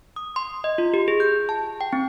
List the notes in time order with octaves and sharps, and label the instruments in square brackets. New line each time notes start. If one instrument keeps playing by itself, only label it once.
[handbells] D#6
C6
D#5
F4
G4
G#4
G6
A5
G5
C4